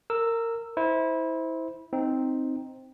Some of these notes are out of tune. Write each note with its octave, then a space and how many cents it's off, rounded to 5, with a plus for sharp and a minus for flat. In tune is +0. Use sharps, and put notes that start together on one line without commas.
A#4 -20 E6 +0
E4 -25 C5 -10
C4 +0 D#4 +0